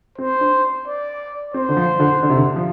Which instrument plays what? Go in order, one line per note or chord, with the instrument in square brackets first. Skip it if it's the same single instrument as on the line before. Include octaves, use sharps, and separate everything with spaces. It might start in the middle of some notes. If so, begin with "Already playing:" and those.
[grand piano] C4 [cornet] C5
[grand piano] D4
[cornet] D5
[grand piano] C4 [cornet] C5
[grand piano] D3
F3
D3
D3
C3
D3
F3